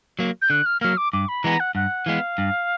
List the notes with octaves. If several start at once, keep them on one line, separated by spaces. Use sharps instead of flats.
F#3 A#3
G6
D3 F#6
F6
F#3 A#3 F6
D6
G2 D6
B5
E3 G#3 B3 A#5
F#5
G2 F#5
E3 G#3 B3 F5
G2